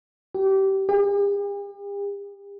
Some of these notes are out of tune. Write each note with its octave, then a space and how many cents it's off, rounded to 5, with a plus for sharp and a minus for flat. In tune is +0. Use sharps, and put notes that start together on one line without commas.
G4 -25
G4 +45